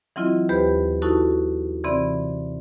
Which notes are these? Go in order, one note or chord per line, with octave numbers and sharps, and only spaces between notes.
E3 F#3 C4 E4 F4 D#5
D#2 G4 B4 C5 B5
D#4 E4 F#4 A4 A5 C#6
C3 E3 C4 D5 B5